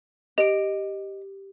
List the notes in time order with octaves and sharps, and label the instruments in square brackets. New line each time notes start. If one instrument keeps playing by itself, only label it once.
[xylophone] G4 D7 [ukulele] D#5